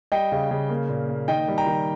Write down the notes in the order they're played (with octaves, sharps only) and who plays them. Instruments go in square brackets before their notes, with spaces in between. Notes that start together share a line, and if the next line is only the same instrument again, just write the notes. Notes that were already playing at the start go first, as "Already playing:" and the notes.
[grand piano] G3 D#5 G5
C#3
C#3
A#3
A#2
A#3
D#3 D#5 G5
G3
G5 A#5
D#3